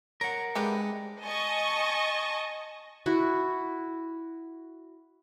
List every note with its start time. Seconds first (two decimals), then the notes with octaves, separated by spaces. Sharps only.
0.21 A#4 C#5 F#5
0.55 C3 G#3 D4 G4 B4
1.24 D#5 G#5 A5 C#6
3.06 E4 F#4